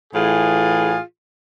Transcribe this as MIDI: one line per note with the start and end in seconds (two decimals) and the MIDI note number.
0.14 0.99 45
0.14 0.99 52
0.14 0.99 65
0.14 0.99 68